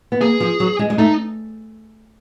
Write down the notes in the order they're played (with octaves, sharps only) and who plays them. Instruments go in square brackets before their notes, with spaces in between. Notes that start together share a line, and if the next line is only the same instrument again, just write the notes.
[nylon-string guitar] B3
[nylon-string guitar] A#3 [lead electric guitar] G#4
[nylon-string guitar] F3
F#3
G#3
G#3
[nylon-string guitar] A3 [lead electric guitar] D#4